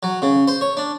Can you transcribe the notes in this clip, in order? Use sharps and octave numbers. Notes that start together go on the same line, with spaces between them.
F#3
C#3
C5
C#5
D4